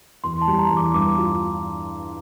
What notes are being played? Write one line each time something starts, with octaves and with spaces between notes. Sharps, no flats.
E2 C6
A5
G3
A#5
E2
D6
G2 D6
F4